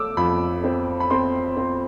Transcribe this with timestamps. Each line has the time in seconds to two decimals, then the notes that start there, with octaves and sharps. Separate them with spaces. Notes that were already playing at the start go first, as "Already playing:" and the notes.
Already playing: A3 D6 E6
0.17 F2 B5
0.64 C4
1.00 B5
1.10 C4 C6
1.57 C4